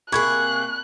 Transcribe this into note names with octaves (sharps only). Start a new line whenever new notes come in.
C3 A#3 G#4 B5 C#6 F#6 G#6